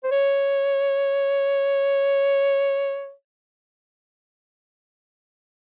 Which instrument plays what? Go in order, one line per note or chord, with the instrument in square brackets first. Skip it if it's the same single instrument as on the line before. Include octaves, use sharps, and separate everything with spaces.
[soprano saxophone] C5
C#5